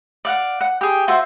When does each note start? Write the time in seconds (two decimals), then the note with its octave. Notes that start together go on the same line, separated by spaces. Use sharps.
0.25 D5 F5 F#5
0.61 F#5
0.81 G4 G#4
1.08 F4 F#4 C5 E5